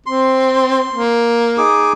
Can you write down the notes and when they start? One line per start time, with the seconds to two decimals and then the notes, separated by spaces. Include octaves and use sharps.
0.06 C4 C6
0.92 A#3
1.58 D#4 G#4 D6